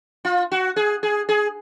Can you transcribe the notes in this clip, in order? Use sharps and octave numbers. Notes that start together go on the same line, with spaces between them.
F4
F#4
G#4
G#4
G#4